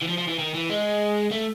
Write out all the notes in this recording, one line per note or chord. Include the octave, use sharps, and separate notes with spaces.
E3
F3
F3
E3
D#3
E3
G#3
A3